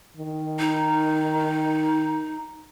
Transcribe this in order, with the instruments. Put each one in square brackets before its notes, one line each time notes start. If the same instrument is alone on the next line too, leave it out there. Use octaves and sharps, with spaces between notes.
[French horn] D#3
[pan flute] D#4